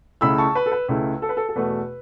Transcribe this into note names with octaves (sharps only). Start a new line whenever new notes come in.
C#2 C#3 A3 E4 B5 E6
A5 C#6
B4
A4
B4
C#2 C#3 A3 E4 B4
A4
B4
A4
A4
E2 B2 A3 B4